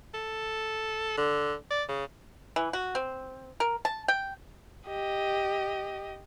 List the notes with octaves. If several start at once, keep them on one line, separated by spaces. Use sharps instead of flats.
A4
D3
D5
C#3
E3
F#4
C4
A#4
A5
G5
G4 D#5